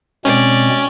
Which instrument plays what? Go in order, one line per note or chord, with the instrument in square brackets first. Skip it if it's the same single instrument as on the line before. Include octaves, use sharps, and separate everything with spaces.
[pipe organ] B2 G#3 C4 [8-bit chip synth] C#4 [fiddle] D5